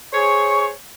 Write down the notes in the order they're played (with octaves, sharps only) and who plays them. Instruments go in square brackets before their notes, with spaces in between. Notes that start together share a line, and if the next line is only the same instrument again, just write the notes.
[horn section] G#4 C5 C#5 [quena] C#6